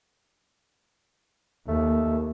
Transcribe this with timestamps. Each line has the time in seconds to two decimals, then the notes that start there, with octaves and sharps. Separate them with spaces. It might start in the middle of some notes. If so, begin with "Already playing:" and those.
1.68 D#2 A3